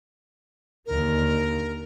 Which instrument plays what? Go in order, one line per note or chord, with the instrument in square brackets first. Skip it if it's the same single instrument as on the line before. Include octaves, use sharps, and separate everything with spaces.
[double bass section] D#2 D3 [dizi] A#4